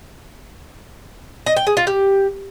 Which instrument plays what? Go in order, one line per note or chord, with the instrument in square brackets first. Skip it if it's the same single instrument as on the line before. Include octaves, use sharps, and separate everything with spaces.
[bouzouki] D#5
G5
G#4
F4
G4